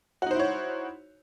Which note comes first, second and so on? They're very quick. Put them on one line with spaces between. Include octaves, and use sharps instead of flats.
F#4 D#4 C5 E4 C#5